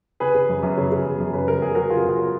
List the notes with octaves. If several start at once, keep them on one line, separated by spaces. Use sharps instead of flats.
C#3 G#4 B4
C#3
F#2
F#2
C#3
C#3
F#2
F#2
C#3 B4
C#3 A#4
F#2 G#4
F#2 F#4 A#4
C#3 F4 G#4
C#3 F4 G#4